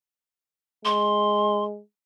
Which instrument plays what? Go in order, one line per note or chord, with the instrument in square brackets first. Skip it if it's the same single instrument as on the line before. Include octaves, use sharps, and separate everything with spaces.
[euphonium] G#3 [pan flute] C6